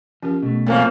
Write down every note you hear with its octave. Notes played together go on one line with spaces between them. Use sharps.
F3 C#4 G4 A#4
B2 A3
F#2 D3 F3 A#3 C4 A4